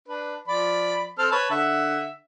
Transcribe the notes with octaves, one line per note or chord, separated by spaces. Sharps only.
D4 B4
F3 D5 B5
C4 A4 F6
B4 C#5 A5
D3 E5 F#5